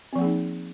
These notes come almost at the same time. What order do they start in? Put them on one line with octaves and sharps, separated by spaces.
C4 F3 A#3 G#4 D#4